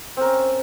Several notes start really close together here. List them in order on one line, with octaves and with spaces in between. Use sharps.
C4 A#4 C#4